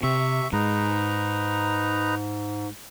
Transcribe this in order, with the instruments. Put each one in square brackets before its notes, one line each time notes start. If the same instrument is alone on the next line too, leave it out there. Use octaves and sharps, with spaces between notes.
[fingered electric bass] C3 [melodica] E5 C#6
[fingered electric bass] G#2 [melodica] D#4 B4 A#5